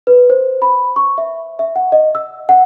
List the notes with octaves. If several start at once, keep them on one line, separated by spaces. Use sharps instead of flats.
B4
C5
B5
C#6
E5
E5
F#5
D#5
E6
F#5